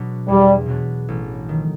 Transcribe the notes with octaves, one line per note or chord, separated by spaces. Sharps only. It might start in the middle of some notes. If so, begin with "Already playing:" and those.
Already playing: B2 F#3 B3 D4
E2 G3
B2 F#3 B3 D4
A1
D#3